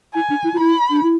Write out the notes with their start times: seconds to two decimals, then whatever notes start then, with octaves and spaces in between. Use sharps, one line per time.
0.15 E4 G#5
0.30 D4
0.44 E4
0.54 F4
0.59 E4 B5
0.91 D4
1.03 E4